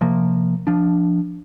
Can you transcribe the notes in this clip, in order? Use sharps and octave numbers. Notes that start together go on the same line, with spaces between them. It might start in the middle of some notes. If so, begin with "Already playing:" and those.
C3 F3 A#3
F3 D4